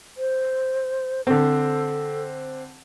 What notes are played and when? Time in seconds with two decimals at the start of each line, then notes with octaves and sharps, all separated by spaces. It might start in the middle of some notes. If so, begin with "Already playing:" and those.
0.17 C5
1.27 D3 C4 A4